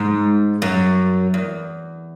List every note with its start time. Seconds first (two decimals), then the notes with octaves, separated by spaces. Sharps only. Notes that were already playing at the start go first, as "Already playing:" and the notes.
Already playing: G#2
0.62 F#2
1.34 E2